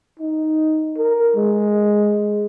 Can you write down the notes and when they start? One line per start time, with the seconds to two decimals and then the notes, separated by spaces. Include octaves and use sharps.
0.19 D#4
0.98 A#4
1.36 G#3